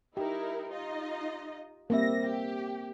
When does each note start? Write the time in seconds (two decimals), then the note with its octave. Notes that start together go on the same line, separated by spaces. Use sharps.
0.17 D#4 E4 G4 A#4
0.69 D#4 F4 D#5
1.90 G3 A#3 C4 E5 A#6
2.24 G4